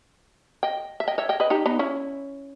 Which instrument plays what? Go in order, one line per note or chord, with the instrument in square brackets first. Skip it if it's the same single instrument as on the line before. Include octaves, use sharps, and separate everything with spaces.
[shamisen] D#5 G5
E5
D#5 G5
C#5 E5
D#5 G5
B4 D#5
D#4 G4
B3 D#4
C#4 E4